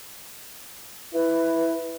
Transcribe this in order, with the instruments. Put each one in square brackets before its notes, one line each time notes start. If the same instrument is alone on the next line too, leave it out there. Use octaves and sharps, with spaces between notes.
[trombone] E4 [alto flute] B4